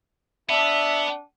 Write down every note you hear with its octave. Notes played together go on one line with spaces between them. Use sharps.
B3 D4 E5